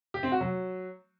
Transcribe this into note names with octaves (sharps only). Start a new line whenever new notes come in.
G4
C4
F#4
F#3